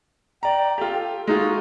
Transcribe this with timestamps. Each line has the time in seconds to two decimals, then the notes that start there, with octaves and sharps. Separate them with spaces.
0.43 D5 G5 A#5
0.78 F4 G4 A4
1.27 G#3 D#4 F4 F#4